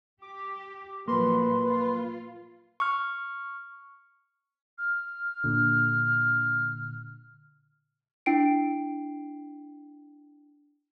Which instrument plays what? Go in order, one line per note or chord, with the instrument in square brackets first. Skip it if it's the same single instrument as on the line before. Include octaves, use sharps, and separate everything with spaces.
[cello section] G4 [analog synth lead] D6
[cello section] A#2 F3 F#3 [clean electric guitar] A#3 [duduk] B4 [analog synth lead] C6
[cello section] F4
[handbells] C#6 F6
[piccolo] F6
[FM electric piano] A#2 D3
[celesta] D4 E4 G5 C7 D7